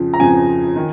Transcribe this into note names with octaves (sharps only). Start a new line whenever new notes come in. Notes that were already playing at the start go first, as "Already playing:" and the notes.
Already playing: F2 C#3 F3
A#5
F2 C#3 F3 G#5
D#3